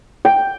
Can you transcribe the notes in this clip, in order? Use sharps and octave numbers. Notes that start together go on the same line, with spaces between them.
G5